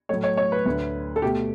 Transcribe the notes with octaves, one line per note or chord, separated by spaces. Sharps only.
A2 F#3 A3 C#5
C#5
C#5
B4
D2 D3 A3
A4
B2 A3 G4